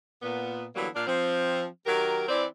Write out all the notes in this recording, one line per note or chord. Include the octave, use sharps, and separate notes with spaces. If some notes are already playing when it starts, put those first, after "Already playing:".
A#2 B3
D3 E3 F#3 G3 A#3 B3
A#2 D4 F5
F3 C4
D#3 F#3 G4 A#4
E3 C4 D5